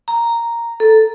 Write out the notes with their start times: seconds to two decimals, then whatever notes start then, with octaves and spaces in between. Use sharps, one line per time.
0.08 A#5
0.80 A4